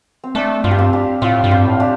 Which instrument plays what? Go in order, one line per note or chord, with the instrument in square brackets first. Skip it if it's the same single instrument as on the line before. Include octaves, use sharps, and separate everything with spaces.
[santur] C4
[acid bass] A3 [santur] D4
[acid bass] G2 [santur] F4
[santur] G4
C4 F4
D4 G4
[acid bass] A2 [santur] C4 F4
[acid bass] G2
[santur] C4 F4
[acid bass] A2
[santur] D4 G4